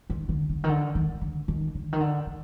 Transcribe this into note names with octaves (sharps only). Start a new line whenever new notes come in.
D#3
D3
D3
D#3
D3
D#3
D3
D#3
D3
D#3
D3
D#3